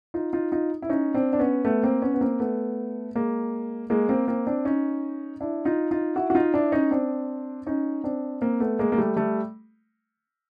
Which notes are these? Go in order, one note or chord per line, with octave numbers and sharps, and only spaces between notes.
D#4 F4
D#4 F4
D#4 F4
E4
C#4 D#4
C4 D4
D4
B3 C#4
A3 B3
A#3 C4
B3 C#4
B3
A#3 C4
A3 B3
G#3 A#3
G#3 A#3
A#3 C4
A#3 C4
C4 D4
C#4 D#4
D4 E4
D#4 F4
D#4 F4
E4 F#4
F#4
D#4 F4
D4 E4
C#4 D#4
C4 D4
C#4 D#4
C4 D4
A#3 C4
A3 B3
G#3 A#3
A#3
G3 A3
G3 A3